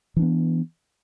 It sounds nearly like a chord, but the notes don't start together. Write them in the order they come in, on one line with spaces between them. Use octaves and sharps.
E3 D4 B3